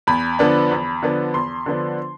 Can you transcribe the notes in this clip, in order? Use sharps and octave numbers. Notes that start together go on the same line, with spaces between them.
E2 B5
D3 F3 B3 D4
E2
D3 F3 B3 D4
E2 C6
D3 F3 B3 D4